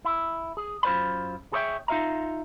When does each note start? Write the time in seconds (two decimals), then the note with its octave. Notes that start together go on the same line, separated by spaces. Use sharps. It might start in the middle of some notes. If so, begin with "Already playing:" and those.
0.05 E4
0.57 G#4
0.83 F#2 F4 C5 D5 B5
1.52 G#4 A4 C#5 D5 E5 G5
1.88 D#4 F4 G#4 E5 F5 A#5